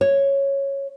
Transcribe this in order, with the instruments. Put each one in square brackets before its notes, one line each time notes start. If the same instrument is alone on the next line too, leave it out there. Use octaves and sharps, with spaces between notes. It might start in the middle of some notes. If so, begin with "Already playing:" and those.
[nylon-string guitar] C#5